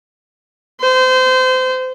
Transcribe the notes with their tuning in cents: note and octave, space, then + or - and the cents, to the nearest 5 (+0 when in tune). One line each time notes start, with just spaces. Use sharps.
C5 -30